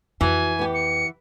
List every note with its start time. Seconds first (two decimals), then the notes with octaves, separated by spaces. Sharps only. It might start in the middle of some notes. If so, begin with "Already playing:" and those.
0.21 F2 E3 F#4 B4 G#5
0.59 B3 G4
0.74 C#7